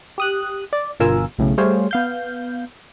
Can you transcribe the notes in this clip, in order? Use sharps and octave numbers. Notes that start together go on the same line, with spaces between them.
G4 D#6 F#6
D5
G1 B2 F4 A#4 G#5 E6
B1 A2 C#3
G3 A3 G#4 C5 C#5 F5
B3 F5 G6